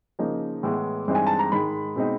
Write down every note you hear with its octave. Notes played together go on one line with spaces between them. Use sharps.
C#3 F3 A#3 D#4
A2 E3 G#3 B3
G2 E3 G#3 C4 D#4
G#5
A5
A#5
G#2 D#3 G#3 B5
B2 G#3 C4 D#4